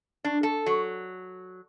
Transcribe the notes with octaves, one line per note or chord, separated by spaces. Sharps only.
D4
A4
F#3